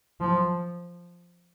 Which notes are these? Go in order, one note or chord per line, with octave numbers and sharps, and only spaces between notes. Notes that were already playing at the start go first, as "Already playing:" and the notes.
F3